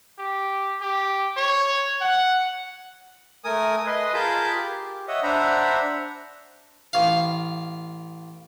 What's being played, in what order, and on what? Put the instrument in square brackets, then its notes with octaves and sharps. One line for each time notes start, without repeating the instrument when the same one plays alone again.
[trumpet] G4
G4
C#5
F#5
[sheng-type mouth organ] A3 A#4 G#5 D#6
B4 D#5 C6
F4 G#4 A#4 A5 B5 G6
G4
C#5 D#5 E5 F#5
D4 C5 E5 F#5 A#5 B5
[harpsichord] A1 F5